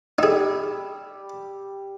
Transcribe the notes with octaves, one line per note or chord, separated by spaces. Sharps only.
G3 D#4 G#4 E6